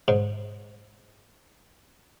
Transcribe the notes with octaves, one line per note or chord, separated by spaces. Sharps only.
G#2